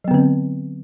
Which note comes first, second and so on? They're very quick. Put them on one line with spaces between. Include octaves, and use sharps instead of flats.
F#3 B3 D3 C4